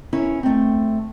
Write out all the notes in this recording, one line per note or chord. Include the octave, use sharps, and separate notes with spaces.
C#4 E4 A#4 C#5
A3 C4